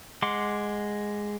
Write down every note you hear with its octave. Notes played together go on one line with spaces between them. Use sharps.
G#3 F#5 C6 D6